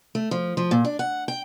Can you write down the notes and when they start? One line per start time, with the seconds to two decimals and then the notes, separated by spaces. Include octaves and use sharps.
0.15 A3
0.31 F3
0.57 F3
0.71 A#2
0.85 D4
0.99 F#5
1.28 G5